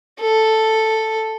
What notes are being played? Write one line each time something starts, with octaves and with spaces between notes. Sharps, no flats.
A4